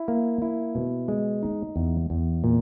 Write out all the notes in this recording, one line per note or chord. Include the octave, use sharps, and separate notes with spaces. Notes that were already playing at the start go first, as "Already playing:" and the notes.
Already playing: E4
A#3
E4
B2
G#3
D#4
E2
E2
A#2